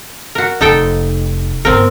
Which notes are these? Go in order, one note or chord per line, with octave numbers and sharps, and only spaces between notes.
F#4 A#4
F1 A3 D#4 A4 G5
G1 D2 C4 A#4